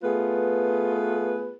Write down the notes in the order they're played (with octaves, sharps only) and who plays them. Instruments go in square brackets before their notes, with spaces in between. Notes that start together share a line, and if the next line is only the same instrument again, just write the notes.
[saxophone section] A3 B3 F4 G#4 B4